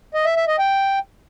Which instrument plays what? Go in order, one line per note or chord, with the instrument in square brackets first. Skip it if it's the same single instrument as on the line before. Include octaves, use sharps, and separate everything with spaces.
[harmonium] D#5
E5
E5
D#5
G5